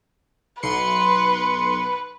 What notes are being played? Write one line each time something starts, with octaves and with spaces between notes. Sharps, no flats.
B1 B4 C6 C#7